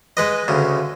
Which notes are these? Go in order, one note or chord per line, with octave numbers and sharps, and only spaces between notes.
G#3 B4 D#5
D2 C#3